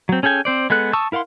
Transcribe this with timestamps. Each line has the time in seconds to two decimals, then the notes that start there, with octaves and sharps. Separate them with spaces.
0.09 F#3 C4
0.23 C#4 G#4 A4 G5 G#5
0.45 C4 C5 D5
0.70 G#3 B3 A4 F#6
0.93 A5 C#6 D#6 E6
1.12 E4 A#4 F5 F#5 C6